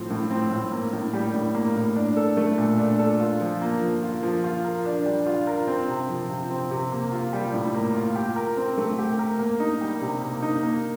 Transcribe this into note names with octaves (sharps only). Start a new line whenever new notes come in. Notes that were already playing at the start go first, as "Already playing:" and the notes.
Already playing: A2 F3 C4
A2
C4
A2
A#3
A2
G3
A2
A#3
A2
D4
A4
A3
A#2
D4
A4
F4
F3
A#3
F3
F4
F3
F4
A#4
D4
G3
F4
A#4
C4
C3
F3
C3
C4
C3
A#3
F4
G3
A2
A#3
F4
G4
A#4
C4
A3
G4
A#4
A#3
D#4
G3
C3
A#3
D#4
A#3